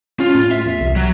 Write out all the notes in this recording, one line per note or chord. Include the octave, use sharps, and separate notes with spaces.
C#4 F4
A2
E5
E2
C2
F#3